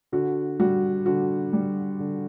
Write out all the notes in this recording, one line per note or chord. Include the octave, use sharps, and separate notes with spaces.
D3 F#4
G3 F#4
D3 F#4
G3
D3